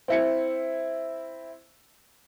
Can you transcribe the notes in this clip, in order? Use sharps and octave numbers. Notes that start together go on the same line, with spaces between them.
C4 E4 C#7